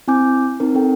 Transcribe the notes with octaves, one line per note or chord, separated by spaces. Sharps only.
C4 E4 G#5 D6 G6
C4 D#4 A#4
C4 A4 G5